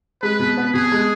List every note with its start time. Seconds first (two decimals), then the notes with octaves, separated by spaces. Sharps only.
0.23 G#3 B4
0.39 B2
0.57 B3
0.74 B2 G#4
0.92 G#3